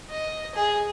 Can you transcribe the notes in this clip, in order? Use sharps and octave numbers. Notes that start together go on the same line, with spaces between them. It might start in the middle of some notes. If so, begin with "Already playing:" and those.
D#5
G#4